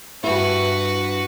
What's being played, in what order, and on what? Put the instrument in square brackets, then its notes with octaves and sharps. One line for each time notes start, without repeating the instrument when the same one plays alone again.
[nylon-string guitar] G2 E4 [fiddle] F#4 B4